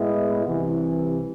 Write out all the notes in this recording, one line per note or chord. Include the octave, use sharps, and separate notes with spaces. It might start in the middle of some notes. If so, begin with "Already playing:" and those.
Already playing: A2 G#3 B3 E4
C2 C3 E3